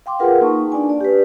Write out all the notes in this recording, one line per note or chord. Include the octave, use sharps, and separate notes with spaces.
F5 G5 C6 D6
F4 G#4 A#4 B4 F5 F#5
A#3 D#4 A5 C#6
D4 D5 G#5
D5
G4 B4